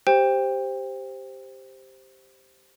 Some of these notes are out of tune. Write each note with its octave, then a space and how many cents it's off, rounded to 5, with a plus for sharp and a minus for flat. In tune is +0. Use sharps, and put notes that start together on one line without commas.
G4 +0 C5 +0 G5 +25